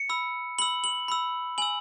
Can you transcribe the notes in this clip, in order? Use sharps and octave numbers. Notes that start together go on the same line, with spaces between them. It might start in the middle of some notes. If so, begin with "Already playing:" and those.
Already playing: C#7
B5 E6
B5 E6 F#7
F#7
B5 E6
G#5 E6 F#7